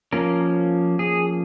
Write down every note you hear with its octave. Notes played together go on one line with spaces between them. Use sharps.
F3 A#3 C#4 A#4
G#4